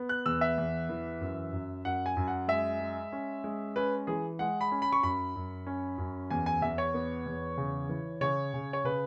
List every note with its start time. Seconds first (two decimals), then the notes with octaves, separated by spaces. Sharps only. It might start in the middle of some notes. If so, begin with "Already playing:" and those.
Already playing: B3
0.09 F#6
0.26 E2 E6
0.41 E5
0.58 E2
0.89 E3
1.21 F#2
1.52 F#2
1.85 F#2 F#5
2.06 G#5
2.17 F#2
2.28 F#5
2.48 G#3 E5
2.81 G#3
3.12 C#4
3.44 G#3
3.76 C#4 B4
4.07 E3 G#4
4.39 G#3 F#5
4.61 B5
4.72 C#4
4.82 B5
4.92 C#6
5.03 F#2 B5
5.36 F#2
5.67 C#4
5.98 F#2
6.30 E2 G#5
6.46 G#5
6.62 E2 E5
6.78 C#5
6.94 B3
7.26 E2
7.58 C#3
7.89 E3
8.21 C#3 C#5
8.54 C#3
8.73 C#5
8.84 C#3 B4